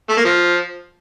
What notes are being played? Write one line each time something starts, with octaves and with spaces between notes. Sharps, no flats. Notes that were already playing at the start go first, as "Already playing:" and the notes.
A3
A#3
F3